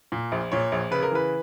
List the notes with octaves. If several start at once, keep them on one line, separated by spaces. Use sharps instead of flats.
A#2
A#1
A#2 C#5
A#1
C#3 B4
A#4
E3 B4